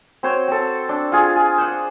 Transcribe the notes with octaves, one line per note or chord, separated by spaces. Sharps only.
C4 F#4 C5 C#5
C4 A4
D4
F4 G#4
G#4
C5 F#5